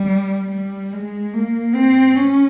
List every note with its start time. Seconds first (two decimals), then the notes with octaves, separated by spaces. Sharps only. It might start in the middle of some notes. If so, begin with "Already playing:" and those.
Already playing: G3
0.51 G3
0.93 G#3
1.34 A#3
1.75 C4
2.16 C#4